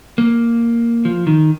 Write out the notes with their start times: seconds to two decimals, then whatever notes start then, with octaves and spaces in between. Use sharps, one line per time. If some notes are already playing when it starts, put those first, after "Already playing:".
0.18 A#3
1.05 F3
1.27 D#3